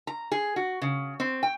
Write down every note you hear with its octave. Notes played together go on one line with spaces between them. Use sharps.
A#5
G#4
F#4
C#3
C4
G5